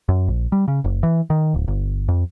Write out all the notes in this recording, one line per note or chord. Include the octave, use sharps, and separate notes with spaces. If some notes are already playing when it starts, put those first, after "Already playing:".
F#2
A#1
G3
C#3
F#1
E3
D#3
D1
G1
F2